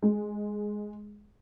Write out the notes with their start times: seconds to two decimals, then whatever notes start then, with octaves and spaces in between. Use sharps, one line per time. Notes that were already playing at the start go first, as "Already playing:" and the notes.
0.02 G#3